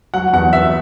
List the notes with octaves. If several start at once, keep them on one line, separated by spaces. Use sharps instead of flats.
F#3 F#5
E2 F#5
B3 E5